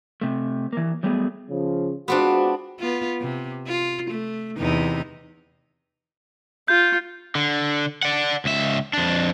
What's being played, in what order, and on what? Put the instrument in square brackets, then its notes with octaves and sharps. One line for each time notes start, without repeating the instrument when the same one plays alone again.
[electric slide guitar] C3 A3
E3 A#3
F#3 G3 A3 B3 G#4
[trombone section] C#3 F3
[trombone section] G#3 F4 F#4 [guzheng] B3 C4 D4
[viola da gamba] B3 F4
C3
F4
A3
E2 C3 D#4
[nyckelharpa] F4 [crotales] G6
[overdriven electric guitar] D3
D5 F#5
C#2 E5
F2 D4